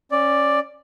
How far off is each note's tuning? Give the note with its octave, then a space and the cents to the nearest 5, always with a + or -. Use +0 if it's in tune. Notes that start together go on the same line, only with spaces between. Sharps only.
C#4 -15 D5 +5